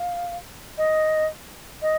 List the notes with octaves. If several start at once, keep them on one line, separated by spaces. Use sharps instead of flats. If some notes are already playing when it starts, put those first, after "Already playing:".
Already playing: F5
D#5
D#5